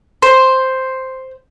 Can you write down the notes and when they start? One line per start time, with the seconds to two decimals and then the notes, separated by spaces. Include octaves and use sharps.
0.22 C5